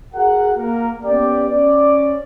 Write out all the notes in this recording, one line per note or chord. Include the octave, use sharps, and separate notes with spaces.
F#4 G#4 A#4 F#5
A#3 A#4
B3 C#4 G4 D5
C#4 D5